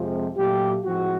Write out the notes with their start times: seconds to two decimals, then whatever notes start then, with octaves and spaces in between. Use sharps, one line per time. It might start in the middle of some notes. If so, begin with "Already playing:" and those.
Already playing: F2 C3 F3 G#3
0.36 A#2 F#3 A3 D4 F4 G4
0.84 A2 F3 G#3 C4 F#4